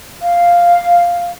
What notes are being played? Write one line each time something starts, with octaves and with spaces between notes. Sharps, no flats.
F5